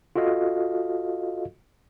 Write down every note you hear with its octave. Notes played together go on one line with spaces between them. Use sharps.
F4 F#4 A4 D#5 F5